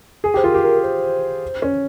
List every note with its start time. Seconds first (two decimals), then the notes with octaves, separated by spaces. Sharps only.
0.24 G#4 G#5
0.34 G4 C5
0.44 F4 A#4
0.54 G4
0.64 A#4
0.84 C5
1.62 C#4